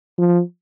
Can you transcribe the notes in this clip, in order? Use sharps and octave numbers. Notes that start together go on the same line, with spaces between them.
F3